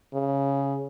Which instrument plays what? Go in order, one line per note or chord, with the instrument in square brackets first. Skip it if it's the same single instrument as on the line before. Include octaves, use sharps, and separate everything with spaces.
[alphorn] C#3